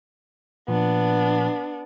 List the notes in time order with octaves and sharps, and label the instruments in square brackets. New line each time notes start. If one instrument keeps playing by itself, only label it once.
[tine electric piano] A#2 F3 [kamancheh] B3 D4